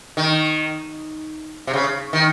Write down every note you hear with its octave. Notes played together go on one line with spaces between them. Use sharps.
D#3
C3
C#3
D#3